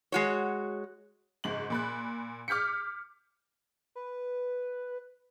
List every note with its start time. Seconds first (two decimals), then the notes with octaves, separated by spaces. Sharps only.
0.12 G#3 F#4 C#5
1.44 F#1 G#2 F#7
1.70 A#2 B5 F#6
2.48 D6 F6 G6 B6 C#7
3.95 B4